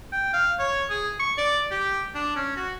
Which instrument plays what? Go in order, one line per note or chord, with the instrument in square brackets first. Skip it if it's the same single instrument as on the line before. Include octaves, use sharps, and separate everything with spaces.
[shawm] G5
F5
C#5
G#4
C#6
D5
G4
D4
C#4
F#4